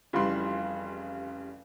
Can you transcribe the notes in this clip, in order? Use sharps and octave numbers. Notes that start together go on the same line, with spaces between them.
F1 C#3 E3 G3 B5 C6